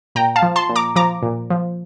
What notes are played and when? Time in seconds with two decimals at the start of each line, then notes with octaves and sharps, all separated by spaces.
0.15 A#2 G5 A#5
0.36 F5 A5
0.42 F3
0.56 A5 C6
0.69 A#2
0.76 A#5 D6
0.96 F3 A#5 D6
1.23 A#2
1.50 F3